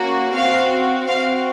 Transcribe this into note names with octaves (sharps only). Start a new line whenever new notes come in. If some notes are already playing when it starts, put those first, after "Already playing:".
Already playing: A#3 C#4 F#4
C4 F#4 F5
C4 F#4 F5